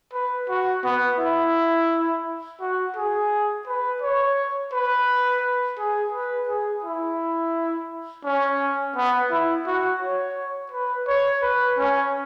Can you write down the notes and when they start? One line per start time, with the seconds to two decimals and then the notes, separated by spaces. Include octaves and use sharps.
0.13 B4
0.49 F#4
0.84 B3
1.18 E4
2.61 F#4
2.96 G#4
3.67 B4
4.02 C#5
4.72 B4
5.78 G#4
6.12 B4
6.48 G#4
6.84 E4
8.24 C#4
8.96 B3
9.31 E4
9.67 F#4
10.01 C#5
10.71 B4
11.07 C#5
11.42 B4
11.78 C#4